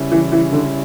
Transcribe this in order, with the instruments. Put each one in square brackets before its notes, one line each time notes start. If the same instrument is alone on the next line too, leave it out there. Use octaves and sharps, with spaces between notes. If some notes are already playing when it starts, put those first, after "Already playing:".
Already playing: [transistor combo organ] C#3 G3 C#4 E4
[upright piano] E3
E3
D3